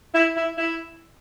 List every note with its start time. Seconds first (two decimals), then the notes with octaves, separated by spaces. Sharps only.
0.13 E4
0.36 E4
0.57 E4